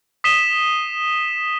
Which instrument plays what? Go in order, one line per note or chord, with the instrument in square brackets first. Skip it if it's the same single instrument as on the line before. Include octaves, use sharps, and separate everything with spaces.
[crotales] D#6 B6 C7 D#7 E7 G7